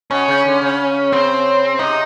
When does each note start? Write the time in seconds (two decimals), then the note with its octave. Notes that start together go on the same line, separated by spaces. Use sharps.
0.10 B2 C#4
0.28 C#3
0.45 D3
0.61 C#3
1.12 C#3 C4
1.79 C3 D#4